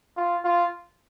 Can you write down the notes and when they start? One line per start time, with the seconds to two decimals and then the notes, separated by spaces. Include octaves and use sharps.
0.17 F4
0.44 F4